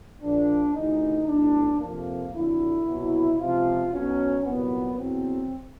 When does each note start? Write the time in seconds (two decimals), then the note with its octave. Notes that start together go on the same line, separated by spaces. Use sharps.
0.21 A#1 A#2 F3 D4
0.74 D2 C#3 E3 D#4
1.27 B1 A2 E3 D4
1.79 F2 C3 F3 A#3
2.33 F2 D3 F#3 E4
2.86 C2 B2 F#3
3.39 C#2 C3 F3 F4
3.91 B1 B2 F#3 C#4
4.44 C2 A#2 F#3 B3
4.97 E2 B2 F#3 C4